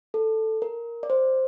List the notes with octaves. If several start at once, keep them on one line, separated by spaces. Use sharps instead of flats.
A4
A#4
D5
C5